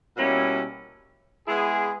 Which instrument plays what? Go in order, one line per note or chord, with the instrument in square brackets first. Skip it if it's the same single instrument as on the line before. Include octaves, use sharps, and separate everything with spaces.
[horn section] B2 G3 A#3 C#4 E4
G#3 B3 E4 G#4